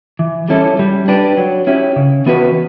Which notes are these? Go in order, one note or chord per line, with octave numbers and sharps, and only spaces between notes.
E3
G3 C#4 E4 A4
G3
D4 G4 B4
F#3
C#4 E4 G4
C#3
E3 B3 F#4 B4